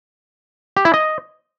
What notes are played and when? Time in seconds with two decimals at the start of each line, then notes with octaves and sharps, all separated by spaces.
0.77 G4
0.85 E4
0.94 D#5